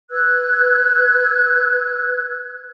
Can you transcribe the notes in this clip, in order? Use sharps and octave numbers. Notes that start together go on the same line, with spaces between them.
B4 E6 F#6 G#6